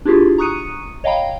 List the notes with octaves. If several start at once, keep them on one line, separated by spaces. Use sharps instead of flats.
D4 E4 F4 G4 G#4
A#5 C#6 D#6 F#6 C#7 D#7
C#5 D#5 F5 G5 A#5 B5